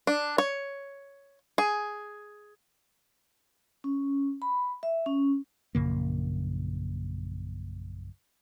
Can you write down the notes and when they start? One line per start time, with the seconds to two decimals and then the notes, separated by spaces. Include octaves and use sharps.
0.07 D4
0.38 C#5
1.58 G#4
3.84 C#4
4.42 B5
4.83 E5
5.06 C#4
5.75 A#1 F#2 C#3 A#3